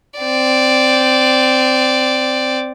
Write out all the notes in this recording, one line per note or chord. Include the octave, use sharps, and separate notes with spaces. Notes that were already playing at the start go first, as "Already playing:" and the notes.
C4 D5